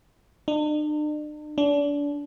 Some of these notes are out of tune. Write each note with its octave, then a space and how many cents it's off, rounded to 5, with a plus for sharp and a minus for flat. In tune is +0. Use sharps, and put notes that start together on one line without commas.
D4 +45
D4 -30